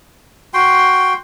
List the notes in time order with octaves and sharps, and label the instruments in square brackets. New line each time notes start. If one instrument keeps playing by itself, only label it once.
[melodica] F#4 G5 C6